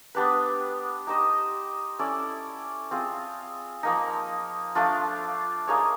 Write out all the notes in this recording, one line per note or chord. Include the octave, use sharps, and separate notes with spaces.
B3 D4 G4 B4
D#4 G4 C5 D#5
C#4 E4 A4 D5
C4 F4 G#4
F3 A#3 D#4
F3 A3 D4 F4
A#3 D#4 G#4 C#5